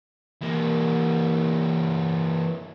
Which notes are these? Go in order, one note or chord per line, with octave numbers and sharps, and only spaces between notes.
E3 A#3